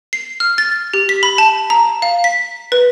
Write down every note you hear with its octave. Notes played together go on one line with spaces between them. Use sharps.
C7
F6
A6
G4
B6
B5
A5
A#5
F5
B6
B4